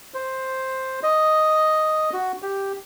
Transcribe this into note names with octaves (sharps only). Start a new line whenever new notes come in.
C5
D#5
F#4
G4